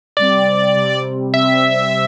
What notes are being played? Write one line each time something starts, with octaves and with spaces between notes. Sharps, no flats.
C3 G3 C4 D5
C3 G3 C4
C3 G3 C4 E5